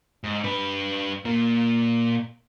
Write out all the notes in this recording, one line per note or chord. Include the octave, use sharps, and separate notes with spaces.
G#2
D4 B4
A#2 A#3